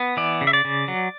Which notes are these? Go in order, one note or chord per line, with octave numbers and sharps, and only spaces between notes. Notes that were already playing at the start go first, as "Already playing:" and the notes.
Already playing: B3
E3 D5
C#3
E5
D5
C#3
F#3